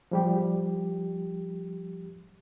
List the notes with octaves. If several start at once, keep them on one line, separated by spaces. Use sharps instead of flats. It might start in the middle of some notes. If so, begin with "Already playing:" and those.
F3 G3 G4